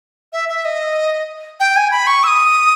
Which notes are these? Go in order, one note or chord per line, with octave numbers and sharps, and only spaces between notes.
E5
E5
D#5
G5
G#5
B5
C#6
E6
D#6